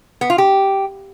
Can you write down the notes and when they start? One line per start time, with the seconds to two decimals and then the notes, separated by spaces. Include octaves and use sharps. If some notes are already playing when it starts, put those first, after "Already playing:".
0.21 B3
0.30 F4
0.38 G4